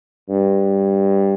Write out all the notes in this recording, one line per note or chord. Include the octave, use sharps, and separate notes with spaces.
G2